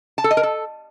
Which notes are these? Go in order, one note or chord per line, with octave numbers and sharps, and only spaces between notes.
A5
A4
D#5
A#4
A4